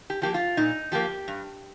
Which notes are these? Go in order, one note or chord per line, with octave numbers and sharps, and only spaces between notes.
G4
F3 A#3 G4
F4
A#2 D#4
F3 A#3 G4
G2